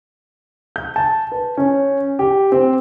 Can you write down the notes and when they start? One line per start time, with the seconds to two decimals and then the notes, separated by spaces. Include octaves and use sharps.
0.76 G6
0.96 A5
1.32 B4
1.57 C#4
2.19 G4
2.52 C4